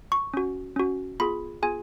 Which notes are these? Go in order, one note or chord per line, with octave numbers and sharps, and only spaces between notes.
C#6
C#4 F#4
C#4 F#4
B3 F4 G#4 B5
B3 F4 G#4 G#5